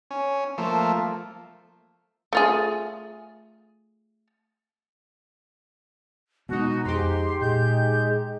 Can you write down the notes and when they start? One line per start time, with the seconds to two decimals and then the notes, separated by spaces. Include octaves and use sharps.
0.11 C#4
0.58 F3 A3 A#3
2.33 A3 F4 G#4
6.49 B2 G#3 B3 D#4 F#4
6.85 F2 G#2 D#4 G4 C6
7.41 A#2 G#3 G6